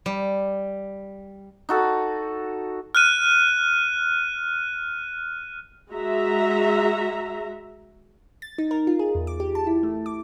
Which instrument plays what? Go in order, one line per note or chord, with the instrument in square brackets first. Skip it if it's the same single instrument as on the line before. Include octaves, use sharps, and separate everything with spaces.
[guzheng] G3
[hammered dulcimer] D#4 F#4 A4
[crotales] F6 F#6 D#7
[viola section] G#3 F#4 E5 A#5
[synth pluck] A6
D#4
A#4
F4
G#4
E2
D6
G4
A5
E4
A3
D6